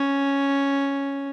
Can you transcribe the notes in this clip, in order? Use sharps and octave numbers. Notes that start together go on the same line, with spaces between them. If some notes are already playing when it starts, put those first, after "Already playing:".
Already playing: C#4